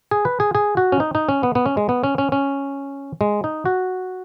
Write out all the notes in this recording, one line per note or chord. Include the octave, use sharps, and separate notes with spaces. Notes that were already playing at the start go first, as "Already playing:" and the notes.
G#4
B4
G#4
G#4
F#4
C#4
D#4
D#4
C#4
B3
B3
C#4
G#3
B3
C#4
C#4
C#4
G#3
D#4
F#4